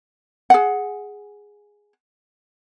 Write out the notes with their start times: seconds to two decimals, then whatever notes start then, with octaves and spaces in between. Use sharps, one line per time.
0.50 G#4 F#5